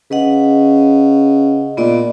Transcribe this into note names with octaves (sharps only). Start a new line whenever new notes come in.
C#3 B4 D#5 F#5
A#2 B3 D5 D#5